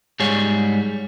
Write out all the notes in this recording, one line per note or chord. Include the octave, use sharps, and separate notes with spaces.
G#2 G3 G#4 C#5